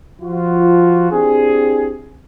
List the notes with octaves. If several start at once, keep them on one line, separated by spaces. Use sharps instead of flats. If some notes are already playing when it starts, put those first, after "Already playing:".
F3 F4 F#4
C4 D4 E4 G4 G#4